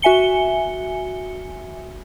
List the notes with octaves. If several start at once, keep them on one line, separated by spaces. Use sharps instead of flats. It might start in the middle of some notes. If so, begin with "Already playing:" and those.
F#4 E5 G#5 C#7 G7